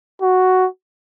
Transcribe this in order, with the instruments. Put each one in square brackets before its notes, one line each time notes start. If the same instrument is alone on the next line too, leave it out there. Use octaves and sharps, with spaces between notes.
[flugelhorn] F#4